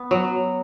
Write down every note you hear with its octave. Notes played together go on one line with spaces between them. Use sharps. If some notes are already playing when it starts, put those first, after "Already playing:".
Already playing: B3
F#3